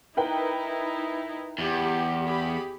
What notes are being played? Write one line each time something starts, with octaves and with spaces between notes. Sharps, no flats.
D#4 E4 A#4 B4 G5
E2 G4
G4 G#4 B5